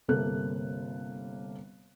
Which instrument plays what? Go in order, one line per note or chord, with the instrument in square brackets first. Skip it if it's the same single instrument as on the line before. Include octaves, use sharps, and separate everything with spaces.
[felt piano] G1 C3 A#3 A4 F#6